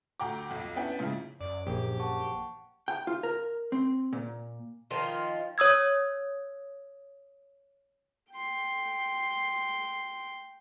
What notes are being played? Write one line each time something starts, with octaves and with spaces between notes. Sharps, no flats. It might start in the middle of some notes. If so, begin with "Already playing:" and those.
D2 G5 A#5 D6
B1 F2
B3 C#4 D4 E4 G5
G#2 C#3 F3 E4
F#2 D5
A#1 G4
F#5 A5 C#6
G5
F4
A#4
C4
A#2
D#3 F3 F4
C#5 D#6 E6 G#6
G5 C6